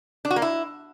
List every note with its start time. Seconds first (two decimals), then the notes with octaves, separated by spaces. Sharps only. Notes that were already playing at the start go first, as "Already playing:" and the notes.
0.25 D4
0.31 F#4
0.36 A#3
0.42 E4